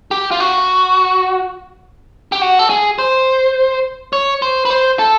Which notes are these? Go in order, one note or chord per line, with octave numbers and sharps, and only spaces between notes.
G4
F4
F#4
G4
F#4
A4
G#4
C5
C#5
C5
B4
C5
A4